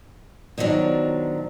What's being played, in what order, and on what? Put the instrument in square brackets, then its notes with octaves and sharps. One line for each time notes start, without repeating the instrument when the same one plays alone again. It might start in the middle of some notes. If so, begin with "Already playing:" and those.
[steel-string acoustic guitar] B2 D#3 F3 F#3 D4